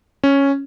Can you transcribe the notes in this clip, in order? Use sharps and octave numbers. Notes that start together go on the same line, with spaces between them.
C#4